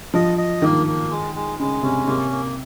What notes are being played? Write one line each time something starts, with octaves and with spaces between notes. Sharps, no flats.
F3 D#5
D#5
D#3 A#3
A#3
G#3
G#3
C#3 G#3
C3 C#4
C3 A#3
A#3